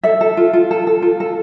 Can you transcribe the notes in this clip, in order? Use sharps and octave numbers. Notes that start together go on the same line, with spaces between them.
A4 E5
A4
F4
F4
A4
A4
F4
A4